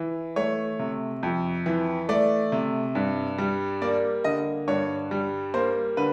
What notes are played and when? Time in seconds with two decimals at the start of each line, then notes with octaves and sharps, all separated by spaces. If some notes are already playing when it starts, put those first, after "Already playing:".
Already playing: E3
0.36 A3 C#5
0.79 C3
1.23 F2
1.66 E3
2.09 A3 D5
2.52 C3
2.95 G2
3.38 G3
3.82 A#3 D5
4.24 D3 D#5
4.68 G2 C#5
5.11 G3
5.54 A#3 C5
5.97 D3 B4